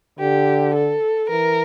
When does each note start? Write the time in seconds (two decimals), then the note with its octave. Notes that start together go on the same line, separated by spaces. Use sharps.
0.19 D3 G4
0.74 A4
1.30 E3 A#4